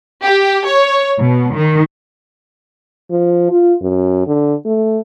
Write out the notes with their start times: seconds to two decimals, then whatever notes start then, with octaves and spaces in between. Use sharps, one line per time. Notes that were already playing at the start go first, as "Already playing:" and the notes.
0.23 G4
0.67 C#5
1.18 B2
1.55 D#3
3.11 F3
3.51 F4
3.82 F#2
4.27 D3
4.65 A3